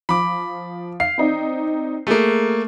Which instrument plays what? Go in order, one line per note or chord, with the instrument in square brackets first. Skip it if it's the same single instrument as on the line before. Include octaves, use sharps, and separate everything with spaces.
[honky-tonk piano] F3 [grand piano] B5 D6
[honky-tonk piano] F5 [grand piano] C7
[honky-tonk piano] C4 D#4 D5
[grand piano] A3 A#3 [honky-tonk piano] G#4